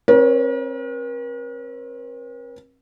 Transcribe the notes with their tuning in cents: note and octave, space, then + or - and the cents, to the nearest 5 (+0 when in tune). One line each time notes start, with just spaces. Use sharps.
C4 +40 A#4 +45 C#5 +10